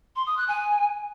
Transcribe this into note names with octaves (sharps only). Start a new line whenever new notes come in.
C6
D#6
F#6
G#5